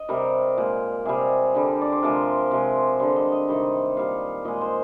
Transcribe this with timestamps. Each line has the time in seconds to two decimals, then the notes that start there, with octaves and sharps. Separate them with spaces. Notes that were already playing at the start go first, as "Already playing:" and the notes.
Already playing: D#5
0.09 C3 G3 A#4
0.58 A#2 G#3
1.05 C3 G3 G#4
1.55 D3 G3
1.82 D5
1.92 C5
2.03 C3 F3 G#3 A#4
2.51 C3 F3 G#3
2.99 D3 G3 C5
3.16 D#5
3.32 D#5
3.48 C3 D#3 G3
3.97 A#2 G3 F5
4.45 A#2 G#3 D#5
4.61 C5